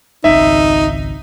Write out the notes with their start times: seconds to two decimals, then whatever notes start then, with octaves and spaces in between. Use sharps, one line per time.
0.24 G#1 C#2 D#4 E5